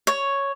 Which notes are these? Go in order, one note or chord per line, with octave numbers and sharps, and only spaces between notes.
C#5